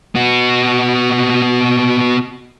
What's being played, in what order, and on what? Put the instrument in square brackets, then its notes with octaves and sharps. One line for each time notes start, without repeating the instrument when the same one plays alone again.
[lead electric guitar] B3 F#4